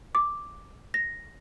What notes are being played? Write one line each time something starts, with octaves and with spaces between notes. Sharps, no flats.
D6
A#6